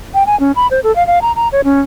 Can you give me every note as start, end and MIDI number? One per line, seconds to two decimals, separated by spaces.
0.14 0.24 79
0.27 0.38 80
0.40 0.52 61
0.56 0.67 83
0.71 0.80 72
0.84 0.94 69
0.96 1.06 77
1.07 1.19 77
1.22 1.32 82
1.36 1.48 82
1.52 1.61 73
1.64 1.81 61